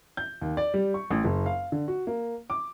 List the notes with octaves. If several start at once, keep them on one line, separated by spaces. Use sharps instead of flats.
G6
D#2
D5
G3
C#6
A1
F#1
F5
D3
F#4
A#3
D6